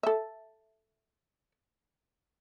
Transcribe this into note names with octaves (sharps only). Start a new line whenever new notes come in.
A4 E5